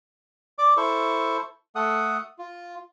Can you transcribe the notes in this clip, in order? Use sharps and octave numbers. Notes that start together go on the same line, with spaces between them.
D5 D6
E4 A4 C5 C#6
A3 A4 F#5 D#6
F4